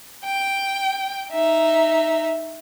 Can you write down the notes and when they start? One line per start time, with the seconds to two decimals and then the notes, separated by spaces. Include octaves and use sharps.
0.25 G5
1.32 D#4 E5